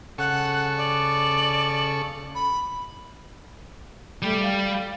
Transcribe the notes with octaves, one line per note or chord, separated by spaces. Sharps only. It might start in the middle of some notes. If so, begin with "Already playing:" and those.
C#3 A4 F#5 C#6
D5
B5
G3 A3 G4
F5